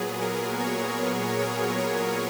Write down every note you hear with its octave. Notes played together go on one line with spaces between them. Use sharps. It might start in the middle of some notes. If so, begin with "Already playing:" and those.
Already playing: A#2 F#3 B3 G#4
A#4
C#5
C#5
A#4